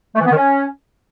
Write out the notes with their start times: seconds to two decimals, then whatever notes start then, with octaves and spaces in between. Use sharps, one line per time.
0.15 A3
0.20 E3
0.25 B3
0.30 D#3
0.36 C#4